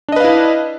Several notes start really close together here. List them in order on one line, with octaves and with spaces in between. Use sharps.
D4 D#5 B4 F5 E4